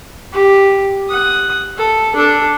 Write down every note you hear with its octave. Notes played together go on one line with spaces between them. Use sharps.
G4
F#5 D#6
A4
D4 A4